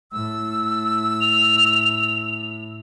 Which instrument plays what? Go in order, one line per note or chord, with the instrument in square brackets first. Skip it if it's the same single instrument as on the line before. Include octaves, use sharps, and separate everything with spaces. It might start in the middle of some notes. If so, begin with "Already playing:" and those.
[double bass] A2 [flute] E6
[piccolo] F7